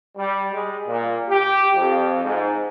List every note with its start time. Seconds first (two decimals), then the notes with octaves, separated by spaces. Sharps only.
0.17 G3
0.53 G#3
0.87 A#2
1.30 G4
1.74 F2
2.24 G#2